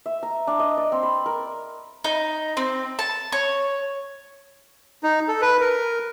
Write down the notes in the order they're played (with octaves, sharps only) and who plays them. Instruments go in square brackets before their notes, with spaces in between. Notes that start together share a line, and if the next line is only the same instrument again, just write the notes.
[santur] E5
A#5
D4
D#5
D5
C4
B5
A#4
[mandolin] D#4
C4
A5
C#5
[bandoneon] D#4
A4
B4
A#4